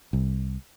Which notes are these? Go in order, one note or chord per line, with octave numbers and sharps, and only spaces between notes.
C2